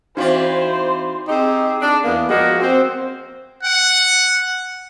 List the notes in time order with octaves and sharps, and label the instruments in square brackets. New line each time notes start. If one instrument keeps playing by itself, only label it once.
[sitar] E3 C4 D5 [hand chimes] D#4 F#4 F5 [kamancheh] C5
[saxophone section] C4 D#4 G4 G#4
D4
E2 A#3 B3
F3 G#3 A#3 F#4
C4
[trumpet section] F#5